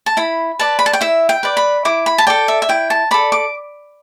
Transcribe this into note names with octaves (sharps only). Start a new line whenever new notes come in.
A5
E4 B5
B4 D5 A5
B5
A5
G5
E4 E5
G5
B4 D5
B5
E4 D6
B5
A5
A4 D5 G5
E5
E5
E4 G5
A5
A4 D5 B5
D6